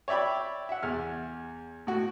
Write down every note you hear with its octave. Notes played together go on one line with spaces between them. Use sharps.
C#5 D5 E5 G5 B5
E5 F#5
E2 F6
A2 F#4